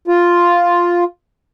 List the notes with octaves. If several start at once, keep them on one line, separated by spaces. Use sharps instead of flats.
F4